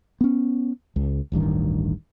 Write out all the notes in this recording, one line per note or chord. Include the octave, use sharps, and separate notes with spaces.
B3 C#4
C#2
D1 A1 G2 D#3